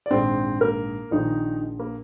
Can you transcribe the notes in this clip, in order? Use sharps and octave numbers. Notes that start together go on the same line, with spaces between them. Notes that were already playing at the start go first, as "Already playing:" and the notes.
D5
A#1 G#2 D#3 C4 C5
A#3 A#4
A#1 A#2 D#3 F3 D#4
A#3